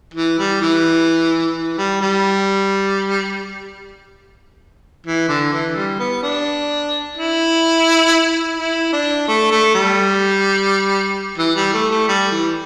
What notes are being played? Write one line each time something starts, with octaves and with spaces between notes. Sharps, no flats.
E3
G3
E3
E3
G3
G3
E3
D3
E3
G3
B3
D4
E4
E4
D4
A3
A3
G3
E3
G3
A3
A3
G3
E3